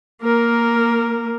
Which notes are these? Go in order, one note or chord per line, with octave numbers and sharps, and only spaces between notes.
A#3 A#4